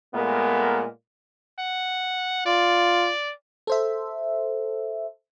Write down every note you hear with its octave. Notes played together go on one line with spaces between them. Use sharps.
A#2 G#3 A3 B3 A#4
F#5
F4 D5
A4 C5 E5